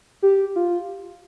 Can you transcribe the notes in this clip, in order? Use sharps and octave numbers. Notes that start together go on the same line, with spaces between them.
G4
F4